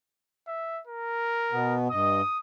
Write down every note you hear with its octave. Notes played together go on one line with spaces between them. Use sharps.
E5
A#4
B2 B3
G2 D#5 D#6